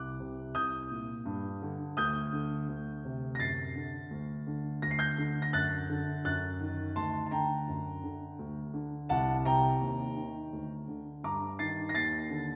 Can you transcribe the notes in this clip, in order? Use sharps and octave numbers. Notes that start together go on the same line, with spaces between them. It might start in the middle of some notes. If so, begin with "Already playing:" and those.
Already playing: C2 D6 F#6
C3
C2 D#6 G6
A#2
G2
D3
D2 D#6 G6
D3
D2
C3
A#6
F#2 A6 C7
D3
D2
D3
D2 A#6
C7
G6 A#6
D3
A#6
F#2 F#6 A6
D3
F#2 F#6 A6
D#3
D2 A5 C6
A5
D3 G5 A#5
F#2
D3
D2
D3
C2 F#5 A5
C3 G5 A#5
D#2
D#3
D2
D3
G2 A#5 D6
D#3 A6 C7
A#6
D#2 A6 C7
D3